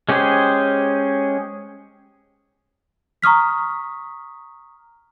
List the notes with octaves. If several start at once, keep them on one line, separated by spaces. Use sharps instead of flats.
G#3 C#4 G4 G#4 C5
A#5 C#6 D#6 F6 B6